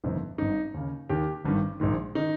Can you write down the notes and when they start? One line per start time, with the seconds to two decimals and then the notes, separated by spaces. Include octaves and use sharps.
0.04 G1 F2 C3 D#3 D#4
0.38 G#1 G2 D#3 D#4
0.74 D#2 C#3
1.09 D#2 D#3 G4
1.44 G#1 G2 D#3
1.80 A#1 G#2 D#3
2.15 D#3 D#4